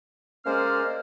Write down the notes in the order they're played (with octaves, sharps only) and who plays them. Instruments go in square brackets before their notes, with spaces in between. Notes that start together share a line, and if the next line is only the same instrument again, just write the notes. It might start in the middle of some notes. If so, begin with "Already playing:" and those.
[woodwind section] G#3 A#3 C#4 C5 D5 F6